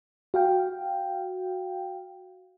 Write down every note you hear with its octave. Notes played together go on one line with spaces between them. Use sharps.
F#4 F5 G5